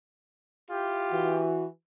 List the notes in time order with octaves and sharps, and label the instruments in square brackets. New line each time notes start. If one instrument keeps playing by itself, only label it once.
[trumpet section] E4 F4 G4
[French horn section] E3 F#4